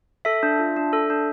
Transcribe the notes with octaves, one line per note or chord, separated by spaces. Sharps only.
A4 E5
D4
F4
D4
A4
D4